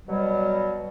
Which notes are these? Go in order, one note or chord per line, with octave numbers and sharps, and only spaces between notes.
B2 F#3 G3